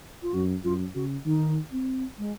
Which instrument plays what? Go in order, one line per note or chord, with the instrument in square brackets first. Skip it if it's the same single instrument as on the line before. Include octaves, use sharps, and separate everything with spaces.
[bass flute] F4
[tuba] F#2 [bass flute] F#4
[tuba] F#2 [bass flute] F4
[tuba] C#3 [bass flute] F#4
[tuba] D#3 [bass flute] D#4
[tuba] C4
[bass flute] G#3